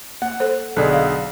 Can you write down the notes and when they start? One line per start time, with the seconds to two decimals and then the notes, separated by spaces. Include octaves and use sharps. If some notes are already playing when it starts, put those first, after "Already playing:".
0.22 A#3 F#5
0.40 A4 C5
0.76 B1 D3 G#4 A4 D5 D#5
0.91 D5 F5